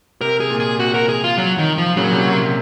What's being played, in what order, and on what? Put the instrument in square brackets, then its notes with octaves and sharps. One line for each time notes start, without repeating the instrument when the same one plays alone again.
[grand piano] C3 [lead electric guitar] A#4
[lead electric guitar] G#4
[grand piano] A#2
[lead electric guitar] G#4
[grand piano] C3 [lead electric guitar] F#4
[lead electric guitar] A#4
G#4
F4
F#3
D#3
F3
[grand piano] A#2 C#3 [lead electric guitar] F#3
[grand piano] C3
A#2
C3